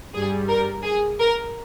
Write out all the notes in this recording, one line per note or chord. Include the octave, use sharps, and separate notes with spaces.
G2 G3 G#4
A#4
G#4
A#4